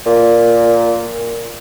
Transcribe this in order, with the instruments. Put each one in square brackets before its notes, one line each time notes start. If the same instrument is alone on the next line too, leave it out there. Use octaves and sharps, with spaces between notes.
[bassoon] A#2